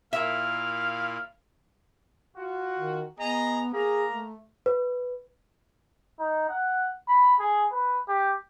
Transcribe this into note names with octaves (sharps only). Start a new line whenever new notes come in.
A#2 E4 A#4 E5 F5
F4 F#4
D#3
B3 G#4 D#5 A#5
A#3 G#4 A#5
A3
B4
D#4
F#5
B5
G#4
B4
G4